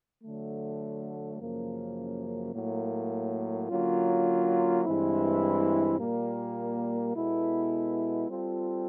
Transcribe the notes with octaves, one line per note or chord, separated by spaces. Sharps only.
D3 F#3 A3
F#2 C#3 F3 A#3
A2 F#3 A#3
D3 F#3 A#3 C#4 F4
G2 E3 G#3 C4 E4
A#2 G3 A#3
B2 G#3 B3 E4 A4
G3 C4 F4 A4